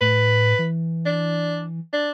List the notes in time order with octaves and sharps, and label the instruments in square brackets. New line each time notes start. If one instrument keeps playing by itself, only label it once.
[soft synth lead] A2 [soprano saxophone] B4
[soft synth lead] E3
[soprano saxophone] D4
D4